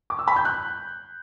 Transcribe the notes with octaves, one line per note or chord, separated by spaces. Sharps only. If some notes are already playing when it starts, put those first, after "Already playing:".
D6
E6
B5
G6
F#6